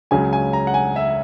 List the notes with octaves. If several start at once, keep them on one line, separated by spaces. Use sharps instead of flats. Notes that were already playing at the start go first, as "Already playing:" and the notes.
C#2 C#3 F#3 G#5
G#5
A#5
F#5
G#5
E5